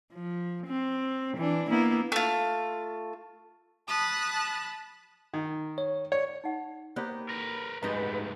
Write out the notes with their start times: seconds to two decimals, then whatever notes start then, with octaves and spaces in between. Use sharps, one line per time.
0.13 F3
0.66 C4
1.37 E3 D4
1.69 A#3 B3 E4
2.12 A3 F4
3.87 A5 B5 D#6 F#6 A6
5.34 D#3
5.78 C#5
6.12 C#5 D5
6.44 D#4 F#5
6.96 A#3 B3 G4 C5 C#5
7.29 A#4 B4
7.83 D2 G#2 G#3 D#4 G4 B4 A#5